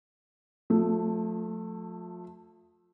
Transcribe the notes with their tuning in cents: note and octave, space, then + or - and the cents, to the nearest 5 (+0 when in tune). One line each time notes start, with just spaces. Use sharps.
F3 +35 A3 +0